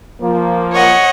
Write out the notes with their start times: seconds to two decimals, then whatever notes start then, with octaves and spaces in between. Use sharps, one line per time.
0.21 F3 A#3
0.72 C#5 D#5 F#5